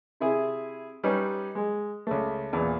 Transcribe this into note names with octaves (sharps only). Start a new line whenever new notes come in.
C3 E4 G#4
G3 C#4 D#4 B4
G#3
C#2 A3
E2 A#2